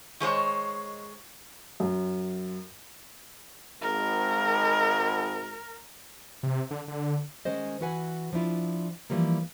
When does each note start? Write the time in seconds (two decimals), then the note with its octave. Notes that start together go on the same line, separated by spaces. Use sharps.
0.20 D#3 G#3 C5 C#5
1.80 F#2
3.81 G#1 A#4
6.43 C3
6.71 D3
6.88 D3
7.45 D#3 G#3 C#4 C5 D#5
7.81 E3 F#4 B4 F#5 G#5
8.33 F3 D4 E4 F4
9.10 E3 F3 G3 A#3